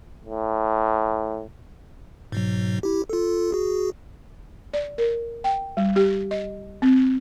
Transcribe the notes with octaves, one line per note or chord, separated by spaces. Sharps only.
A2
G#2 B2 F#3
E4 G4
F4 A4
F#4 G#4
D5
A#4
G5
G3
G4
D#5
C4